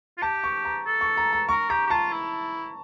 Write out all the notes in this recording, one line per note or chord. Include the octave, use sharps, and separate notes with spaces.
F4
G4 A5
C#6
A#5
A4
C#6
A#5
A#5
A#4 C#6
G4 A#5
G4
F4 A5
E4